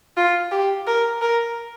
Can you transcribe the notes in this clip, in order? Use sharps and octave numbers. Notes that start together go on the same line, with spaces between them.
F4
G4
A#4
A#4